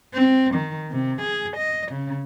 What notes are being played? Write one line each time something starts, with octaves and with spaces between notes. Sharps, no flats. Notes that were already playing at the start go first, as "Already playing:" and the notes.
C4
D#3
C3
G#4
D#5
C#3